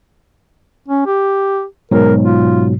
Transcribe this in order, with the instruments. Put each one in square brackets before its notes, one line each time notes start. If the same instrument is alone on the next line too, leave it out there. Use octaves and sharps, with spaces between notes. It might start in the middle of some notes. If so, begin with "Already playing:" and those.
[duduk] C#4
G4
[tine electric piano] G#2 B2 F#3 [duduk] A#4
[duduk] F4